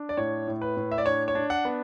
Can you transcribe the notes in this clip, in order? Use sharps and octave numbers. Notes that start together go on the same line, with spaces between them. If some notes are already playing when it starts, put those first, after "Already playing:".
Already playing: D4
D5
A2 C#5
A2
B4
A2
E5
D5
D4 C#5
C#5
D4
F#5
B3